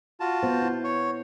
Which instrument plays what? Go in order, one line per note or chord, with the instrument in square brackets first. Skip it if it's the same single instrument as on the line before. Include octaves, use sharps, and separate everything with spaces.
[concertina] F4 F#4 A5
[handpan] B3 C5
E4
[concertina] C#5